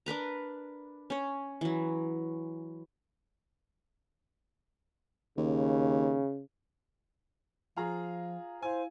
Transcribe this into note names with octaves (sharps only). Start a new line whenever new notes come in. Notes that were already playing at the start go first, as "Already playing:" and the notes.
D4 A#4 B4 A#5
C#4 C#5
E3 F#3
D#2 C#3
F3 F4 G#4 F5 A#5
E4 C5 F5 G#5